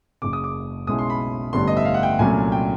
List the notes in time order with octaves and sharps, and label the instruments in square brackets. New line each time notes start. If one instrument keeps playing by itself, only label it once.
[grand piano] F#1 F#2 C#3 D6
D#6
D6
B1 B2 G#3 C#4 E4 D#6
C6
B5
A1 G2 D3 G3 B3 C6
D#5
E5
F5
F#5
G5
C2 A#2 F#3 A3 C#4 G#5
G5